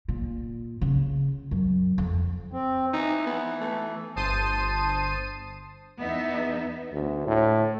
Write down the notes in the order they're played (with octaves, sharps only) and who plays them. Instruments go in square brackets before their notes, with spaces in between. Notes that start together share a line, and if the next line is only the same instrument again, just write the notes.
[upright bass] A#2
C#3
F#2
F2
[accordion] C4
[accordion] E3 [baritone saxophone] D#4
[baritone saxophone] B3
A3
[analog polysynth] G1 C5 A5 D#6 C7 D#7
[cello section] E2 B3 D#4 E5
[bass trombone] D2
A2